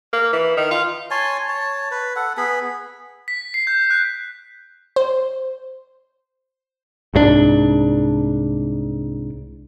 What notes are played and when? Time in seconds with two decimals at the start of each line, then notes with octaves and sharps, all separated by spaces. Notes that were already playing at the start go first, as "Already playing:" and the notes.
0.13 A#3
0.33 E3
0.57 D#3
0.71 F4
1.11 C#5 G#5 A5 C6
1.49 C#5 A5
1.91 B4
2.16 A4 F#5
2.37 B3 G#4 B5
3.28 B6
3.54 C7
3.67 G6
3.90 F#6
4.96 C5
7.14 C2 G#2 F3 D4